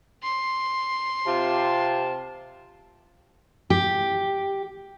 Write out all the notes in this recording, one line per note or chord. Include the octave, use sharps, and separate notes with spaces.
C6
C3 F4 A5
G4